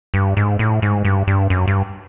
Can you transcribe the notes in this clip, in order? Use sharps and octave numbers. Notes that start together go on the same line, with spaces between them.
G2
G#2
A2
G#2
G2
G2
F#2
G2